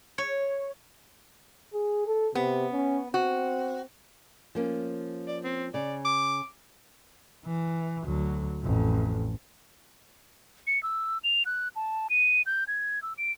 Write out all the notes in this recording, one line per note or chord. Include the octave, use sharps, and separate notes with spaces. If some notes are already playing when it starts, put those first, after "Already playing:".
C#5
G#4
A4
C3 B3
C#4
C4 F#4
F3 A#3 C#4
D5
C4
C#3 D5
D6
E3
D2 F#3
A1 F2
C#7
E6
F7
F#6
A5
D#7
G6
G#6
E6
D7